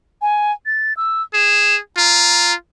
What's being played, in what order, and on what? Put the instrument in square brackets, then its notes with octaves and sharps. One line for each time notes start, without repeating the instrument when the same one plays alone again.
[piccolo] G#5
A6
E6
[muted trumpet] G#4 [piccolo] E7
[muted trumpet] F4 [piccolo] A#5